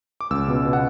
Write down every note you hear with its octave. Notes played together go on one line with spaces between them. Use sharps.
D6
C#2 E6
B2
B2
F#5